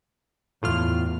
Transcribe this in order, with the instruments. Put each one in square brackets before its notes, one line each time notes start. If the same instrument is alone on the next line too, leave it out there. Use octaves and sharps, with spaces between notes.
[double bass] E2 [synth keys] A2 F4 F6